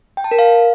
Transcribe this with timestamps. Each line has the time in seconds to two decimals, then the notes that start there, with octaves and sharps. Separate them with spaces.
0.17 G5
0.24 A5
0.31 A#4
0.39 F5